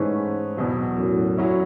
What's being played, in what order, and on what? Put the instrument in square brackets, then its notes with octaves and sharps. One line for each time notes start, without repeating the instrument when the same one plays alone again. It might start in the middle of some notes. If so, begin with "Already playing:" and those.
Already playing: [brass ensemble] G#2 [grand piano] E3 A3 C#4 G#4 B4
[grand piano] E2 B2 F#3
[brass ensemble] F#2 A2
[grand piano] F#3 C#4 E4